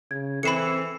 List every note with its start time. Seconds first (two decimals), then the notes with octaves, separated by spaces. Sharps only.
0.11 C#3 G#6
0.43 E3 C4 A4 B5 C7 C#7 E7